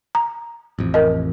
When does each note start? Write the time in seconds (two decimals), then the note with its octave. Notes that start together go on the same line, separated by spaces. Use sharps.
0.15 A#5
0.79 A1 F2
0.94 A#4 D#5